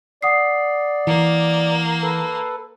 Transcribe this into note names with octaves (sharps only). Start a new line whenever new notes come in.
D5 F#5 D#6 C7
E3 A#3
A4 B4